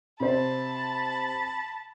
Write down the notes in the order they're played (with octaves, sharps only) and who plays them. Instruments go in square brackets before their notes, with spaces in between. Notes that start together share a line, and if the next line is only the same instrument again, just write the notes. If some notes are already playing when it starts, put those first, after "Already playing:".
[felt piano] C3 C5 [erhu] A5 [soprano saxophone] B5